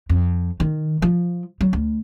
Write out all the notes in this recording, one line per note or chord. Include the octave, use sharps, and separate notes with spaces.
F2
D#3
F3
F#3
D2